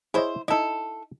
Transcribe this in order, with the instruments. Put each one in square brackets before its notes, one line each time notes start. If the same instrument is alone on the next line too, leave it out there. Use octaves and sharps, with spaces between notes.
[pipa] E4 C5 [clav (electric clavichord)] G#4 C#5 D#5
[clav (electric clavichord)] D#4 D#5 [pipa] E4 A4